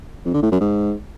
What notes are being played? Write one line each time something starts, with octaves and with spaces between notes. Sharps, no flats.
F2
D3
A2
F#2
G#2